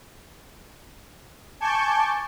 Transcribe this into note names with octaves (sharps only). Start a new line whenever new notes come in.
G#5 A5 C#6 D6 G6